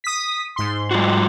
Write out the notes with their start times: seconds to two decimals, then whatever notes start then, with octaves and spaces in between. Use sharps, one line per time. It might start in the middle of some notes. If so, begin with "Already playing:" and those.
0.04 D#6 B6
0.56 G#2 C6
0.91 G3 F4 F#4